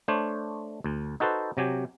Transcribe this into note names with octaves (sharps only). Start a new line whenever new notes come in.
A3 D4 C5 C#5
D2
D#4 F#4 A4 B4 C5
C3 F#3 G4 G#5